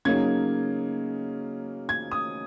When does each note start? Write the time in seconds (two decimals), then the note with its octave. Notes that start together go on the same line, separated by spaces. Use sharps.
0.05 C#3 F#3 A#3 D#4 G#6
1.89 G#6
2.11 D#6